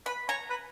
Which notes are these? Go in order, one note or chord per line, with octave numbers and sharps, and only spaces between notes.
B4 B5
C#5 A#5
B4